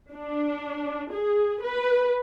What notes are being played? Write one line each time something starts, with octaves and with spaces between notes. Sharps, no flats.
D4
G#4
B4